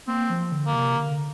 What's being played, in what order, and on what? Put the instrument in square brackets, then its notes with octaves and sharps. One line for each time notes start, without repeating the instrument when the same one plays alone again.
[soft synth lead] A#3 [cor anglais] C4
[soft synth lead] F3
D3
[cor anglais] A#3
[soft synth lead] C3
D3